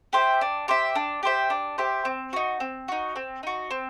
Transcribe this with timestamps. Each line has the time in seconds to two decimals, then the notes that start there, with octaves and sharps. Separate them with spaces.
0.13 G4 C5 E5
0.41 D4
0.68 G4 C5 E5
0.95 D4
1.23 G4 C5 E5
1.50 D4
1.78 G4 C5 E5
2.05 C4
2.33 D#4 F#4
2.60 C4
2.88 D#4 F#4
3.16 C4
3.43 D#4 F#4
3.71 C4